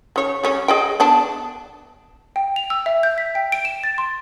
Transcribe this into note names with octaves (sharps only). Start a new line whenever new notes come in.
C#3 C#5
G3 C#4 C#5
G#4 D#5 G5
B3 D4 A5
G5
F7
E6
E5
G6
B6
G5
D7
E7
A6
C6